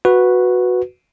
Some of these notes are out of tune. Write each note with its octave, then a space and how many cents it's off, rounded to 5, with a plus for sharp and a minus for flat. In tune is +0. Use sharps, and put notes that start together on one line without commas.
F#4 -10 B4 +0